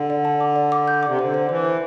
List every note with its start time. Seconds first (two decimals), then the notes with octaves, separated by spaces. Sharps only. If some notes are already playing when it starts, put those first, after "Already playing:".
Already playing: D3
0.10 D5
0.25 A5
0.40 D6
0.56 D5
0.72 D6
0.88 G6
1.03 D6
1.08 C3
1.19 D3 C5
1.34 C5
1.49 E3 C5
1.65 C5